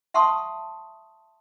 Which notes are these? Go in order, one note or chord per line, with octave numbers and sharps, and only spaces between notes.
E5 F#5 A5 C6 C#6 D#6